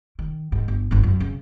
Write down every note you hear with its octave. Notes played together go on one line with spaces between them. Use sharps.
D#3
G#2
G1
G1 G#2
F#2
C#3